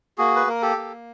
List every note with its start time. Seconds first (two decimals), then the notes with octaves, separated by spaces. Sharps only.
0.18 A#3 F#4 G#4
0.36 B4
0.47 A#3 A#4
0.62 G4 A4
0.76 A#3